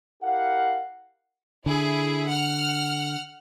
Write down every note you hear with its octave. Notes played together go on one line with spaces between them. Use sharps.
E4 G4 A#4 F5 F#5
D3 E4 G#4
F#5 F6